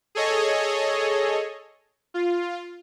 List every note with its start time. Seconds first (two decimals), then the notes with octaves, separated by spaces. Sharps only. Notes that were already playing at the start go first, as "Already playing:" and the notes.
0.15 G#4 A4 C#5 D#5
2.14 F4